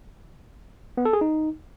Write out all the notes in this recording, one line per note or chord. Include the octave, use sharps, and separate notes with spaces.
B3
A4
G#4
D#4